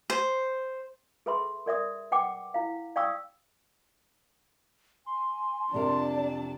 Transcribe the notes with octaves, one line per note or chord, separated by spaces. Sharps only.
C5
G#4 A4 B4 E5 B5 C6
A#4 D5 E5 D#6
B4 F#5 G5 D6
E4 F5
D5 F5 G5 C#6 D#6 E6
G#5 C6
F2 C3 D4 A#4 D5 A5